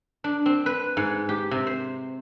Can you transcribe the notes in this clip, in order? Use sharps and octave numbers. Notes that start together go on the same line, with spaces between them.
D4
C4
B4
G#2
G4
C3
C5